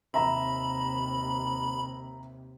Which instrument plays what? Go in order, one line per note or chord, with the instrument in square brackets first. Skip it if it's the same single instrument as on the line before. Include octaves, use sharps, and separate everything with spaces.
[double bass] D#2 C3 [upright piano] E5 A#5 [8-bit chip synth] B5